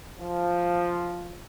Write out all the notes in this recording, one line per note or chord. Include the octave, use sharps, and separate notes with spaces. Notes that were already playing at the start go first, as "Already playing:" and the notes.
F3